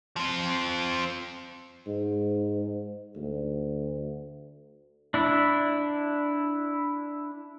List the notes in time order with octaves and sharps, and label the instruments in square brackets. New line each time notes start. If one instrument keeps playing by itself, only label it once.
[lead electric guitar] F3 C4
[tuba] G#2
D2
[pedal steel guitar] D4 E4